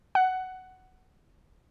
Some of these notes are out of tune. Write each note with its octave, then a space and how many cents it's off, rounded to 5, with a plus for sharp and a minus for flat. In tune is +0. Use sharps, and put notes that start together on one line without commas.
F#5 +10